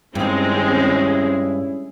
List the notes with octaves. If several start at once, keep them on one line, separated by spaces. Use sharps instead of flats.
G2 D#3 G#3 C4 C#4 E4 G#4